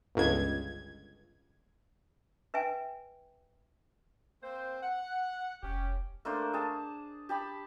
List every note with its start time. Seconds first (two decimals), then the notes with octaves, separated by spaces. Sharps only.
0.15 G1 C#2 G#6
2.54 B4 E5 G5 G#5
4.43 A#3 C4 C5
4.82 F#5
5.63 F1 C#4 G4
6.25 A3 A#3 D4 C5
6.53 G#4 A5
7.29 G4 A5 B5